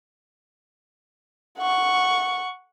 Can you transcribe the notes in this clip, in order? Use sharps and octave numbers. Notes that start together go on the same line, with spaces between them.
F#5 C#6